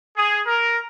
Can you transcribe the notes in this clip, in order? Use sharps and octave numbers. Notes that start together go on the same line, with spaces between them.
G#4
A#4